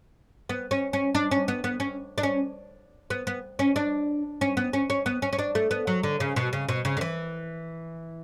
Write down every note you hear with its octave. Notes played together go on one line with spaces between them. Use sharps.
B3
C#4
C#4
D4
C#4
B3
B3
C#4
D4
C#4
B3
B3
C#4
D4
C#4
B3
C#4
C#4
B3
C#4
C#4
D4
A3
B3
F#3
D3
C#3
B2
C#3
B2
C#3
D3
E3